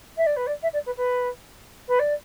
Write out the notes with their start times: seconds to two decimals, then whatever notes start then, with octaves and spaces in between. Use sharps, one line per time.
0.17 E5
0.26 D5
0.36 B4
0.46 D5
0.62 E5
0.73 D5
0.85 B4
0.96 B4
1.87 B4
1.99 D5